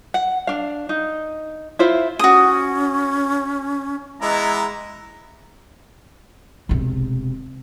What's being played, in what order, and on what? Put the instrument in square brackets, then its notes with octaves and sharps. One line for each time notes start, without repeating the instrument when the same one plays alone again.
[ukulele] F#5
D4 F5
D#4
E4 F4 C5 E5
[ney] C#4 [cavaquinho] F#4 D#6
[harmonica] E3 B3 E4 [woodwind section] G#3 A#5
[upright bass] E1 C3